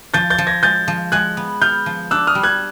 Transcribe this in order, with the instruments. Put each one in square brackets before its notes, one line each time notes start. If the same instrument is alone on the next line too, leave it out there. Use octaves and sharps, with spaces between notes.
[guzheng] F3 [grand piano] G6 A6
[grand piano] G6 A6
[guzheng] F3
[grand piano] G#6 A#6
[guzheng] G#3 [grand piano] G6 A6
[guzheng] F3
[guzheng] G#3 [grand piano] F#6 G#6
[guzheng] B3
[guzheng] B3 [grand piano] F6 G6
[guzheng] F3
[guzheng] D4 [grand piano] E6 F#6
[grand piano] D#6 F6
[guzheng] G3
[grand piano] F#6 G#6